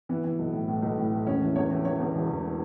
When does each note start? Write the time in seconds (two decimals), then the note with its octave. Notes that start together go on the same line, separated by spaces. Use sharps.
0.09 E3 B3
0.24 E3
0.39 B1
0.53 A2
0.68 A2
0.82 B1
0.97 A2
1.12 A2
1.26 E1 C#4
1.41 E3
1.56 E2 C#5
1.70 E3
1.85 E3 C#5
2.00 E2
2.14 E1
2.29 E1